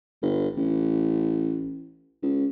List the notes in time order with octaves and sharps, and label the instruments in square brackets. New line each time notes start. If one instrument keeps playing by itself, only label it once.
[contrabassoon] G1
A1
C#2